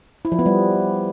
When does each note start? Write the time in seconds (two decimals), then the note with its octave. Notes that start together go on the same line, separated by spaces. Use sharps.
0.25 E4
0.32 F3
0.39 B3
0.46 G3